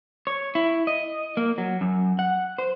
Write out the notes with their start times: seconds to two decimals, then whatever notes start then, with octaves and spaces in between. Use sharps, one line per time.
0.27 C#5
0.55 E4
0.87 D#5
1.37 A#3
1.58 F#3
1.81 F#2
2.19 F#5
2.58 C5